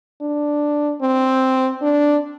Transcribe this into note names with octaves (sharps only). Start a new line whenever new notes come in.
D4
C4
D4